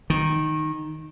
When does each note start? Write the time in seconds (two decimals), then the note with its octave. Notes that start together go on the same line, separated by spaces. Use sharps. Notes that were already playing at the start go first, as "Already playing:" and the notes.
0.10 D#3